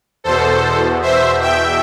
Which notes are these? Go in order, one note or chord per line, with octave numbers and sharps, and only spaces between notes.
E2 B2 A4 C5
C5 E5
E5 G5